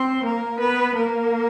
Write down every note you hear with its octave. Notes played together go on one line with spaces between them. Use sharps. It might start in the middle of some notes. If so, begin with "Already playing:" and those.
Already playing: C4 C5
A#3 A#4
B3 B4
A#3 A#4